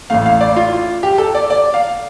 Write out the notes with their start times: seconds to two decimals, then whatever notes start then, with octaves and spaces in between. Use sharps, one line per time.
0.10 A1 A2 A3 F5
0.26 F5
0.41 D5
0.56 F4
1.03 G4
1.18 A4
1.35 D5
1.50 D5
1.74 F5